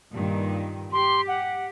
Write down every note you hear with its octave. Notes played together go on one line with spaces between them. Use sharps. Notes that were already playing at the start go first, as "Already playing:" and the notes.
G2 A#2 D#3
G4 C6
F#5